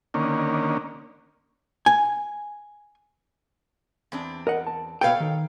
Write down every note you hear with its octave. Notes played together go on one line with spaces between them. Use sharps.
D3 D#3 A#3 C#4
G#5
E2 C4 D4
A#4 D#5 F#5
A5
B2 A4 B4 C#5 F5 G5
D#3